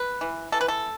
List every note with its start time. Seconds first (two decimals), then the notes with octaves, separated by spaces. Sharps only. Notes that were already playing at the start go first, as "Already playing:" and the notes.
Already playing: B4
0.21 E3
0.52 E3 A4
0.61 B4
0.68 A4